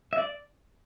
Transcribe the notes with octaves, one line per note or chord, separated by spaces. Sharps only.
E5
D5